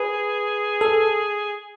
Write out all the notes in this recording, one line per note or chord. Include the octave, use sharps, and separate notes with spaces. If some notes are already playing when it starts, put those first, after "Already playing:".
Already playing: G#4 B4
A4